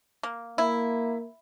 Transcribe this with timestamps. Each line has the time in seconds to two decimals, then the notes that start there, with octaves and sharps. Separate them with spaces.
0.23 A#3
0.58 A#3 E4